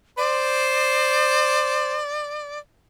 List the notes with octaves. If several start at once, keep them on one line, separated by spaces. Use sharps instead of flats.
C5 D5